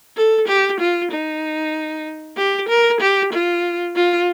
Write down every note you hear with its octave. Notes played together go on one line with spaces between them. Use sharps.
A4
G4
F4
D#4
G4
A#4
G4
F4
F4